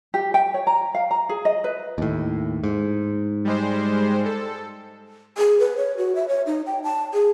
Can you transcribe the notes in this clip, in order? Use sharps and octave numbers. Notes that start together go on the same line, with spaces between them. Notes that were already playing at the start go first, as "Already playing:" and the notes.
G4
G5
C#5
A#5
F5
A#5
G#4
D#5
B4
D#2 A2
G#2
G3 G#3 C5
A4
G#4
B4
C#5
F#4
E5
C#5
D#4
G5
A5
G#4